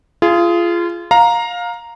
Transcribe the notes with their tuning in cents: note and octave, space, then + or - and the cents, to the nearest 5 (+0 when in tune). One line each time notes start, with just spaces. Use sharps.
F4 -25 G#4 +10
F5 +20 A#5 +0